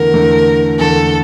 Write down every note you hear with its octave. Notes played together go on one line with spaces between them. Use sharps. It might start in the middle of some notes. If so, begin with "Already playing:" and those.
Already playing: E2 D3 A3 A#4
E2 D3 A3
E2 D3 A3 A4